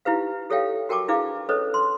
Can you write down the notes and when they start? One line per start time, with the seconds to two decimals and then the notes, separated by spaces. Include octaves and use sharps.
0.05 D#4 E4 G4 B4 F5
0.50 G4 A4 C#5 E5 F5 G5
0.89 F#4 A#4 G5 A5 C#6 D6
1.08 D4 E4 G#4 B4 F5 D6
1.49 C#4 A4 B4 C#5 D#5
1.74 C6